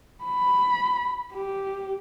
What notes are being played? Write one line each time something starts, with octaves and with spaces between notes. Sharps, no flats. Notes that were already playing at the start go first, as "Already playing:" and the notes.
B5
G4